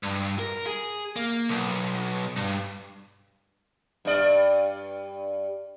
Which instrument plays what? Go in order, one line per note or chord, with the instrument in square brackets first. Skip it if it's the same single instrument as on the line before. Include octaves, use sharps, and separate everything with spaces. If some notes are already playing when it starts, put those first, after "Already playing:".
[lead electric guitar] G2
A#4
G#4
A#3
B1
G2
[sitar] G2 D5